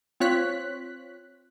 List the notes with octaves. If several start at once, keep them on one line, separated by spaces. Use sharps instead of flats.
C4 F4 C#5 F#6 B6